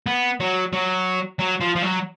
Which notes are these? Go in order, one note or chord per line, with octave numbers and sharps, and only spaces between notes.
B3
F#3
F#3
F#3
F3
F3
F#3